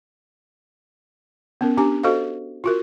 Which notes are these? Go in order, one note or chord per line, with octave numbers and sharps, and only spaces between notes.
B3 C#4 A#4
D4 G4 G#5
F#4 A4 C5 D#5 F5
F4 F#4 A#4